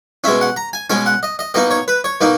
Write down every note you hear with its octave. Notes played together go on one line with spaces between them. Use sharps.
B2 G#3 C#4 E5
F#5
A#5
G#5
B2 G#3 C#4 G#5
F#5
D#5
D#5
B2 A#3 D#4 D#5
C#5
B4
C#5
B2 A#3 D#4